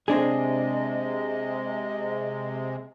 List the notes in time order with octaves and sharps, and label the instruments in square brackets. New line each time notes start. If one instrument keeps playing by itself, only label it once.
[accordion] C3 G#3 [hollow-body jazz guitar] C4 D4 G#4 [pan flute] D#5